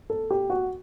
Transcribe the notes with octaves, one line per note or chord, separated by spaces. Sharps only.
A4
G4
F#4